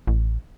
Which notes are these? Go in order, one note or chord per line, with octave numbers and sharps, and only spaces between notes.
A1